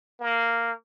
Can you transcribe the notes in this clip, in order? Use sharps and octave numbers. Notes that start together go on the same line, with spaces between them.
A#3